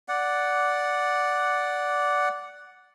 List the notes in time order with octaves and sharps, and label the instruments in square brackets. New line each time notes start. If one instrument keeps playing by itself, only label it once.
[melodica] D5 F#5